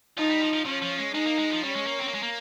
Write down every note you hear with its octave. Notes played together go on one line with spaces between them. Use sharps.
F3 D#4
G3
F3
F3
F3 C#4
F3
G#3
G#3 D#4
A#3
G#3
F3
G3 C#4
G#3
A#3
C4
A#3
G#3
A#3